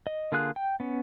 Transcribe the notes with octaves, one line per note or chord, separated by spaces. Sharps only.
D#5
D3 A#3 F4 G#4 F#6
G5
B3 C#4